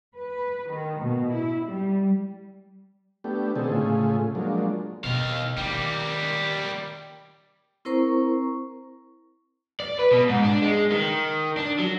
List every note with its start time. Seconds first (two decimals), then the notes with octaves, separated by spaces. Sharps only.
0.17 B4
0.70 D#3
1.02 B2
1.33 E4
1.67 G3
3.24 A3 B3 D4 G4
3.56 B2 D3 D#3 C4 G#4 A4
3.72 A2 C#3 A3 F4 G#4
4.35 F3 F#3 G#3 A#3 D4
5.04 B2 D#3 F5
5.57 D#3 G3 A#3
7.85 C4 E4 A#4 C5 A#5 C#6
9.80 D5
9.99 B4
10.11 B2
10.29 G#2
10.43 D4
10.62 G#3
10.92 D#3
11.57 D4
11.79 F#3